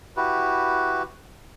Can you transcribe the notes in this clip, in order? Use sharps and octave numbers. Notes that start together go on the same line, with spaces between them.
E4 F#4 G4 B4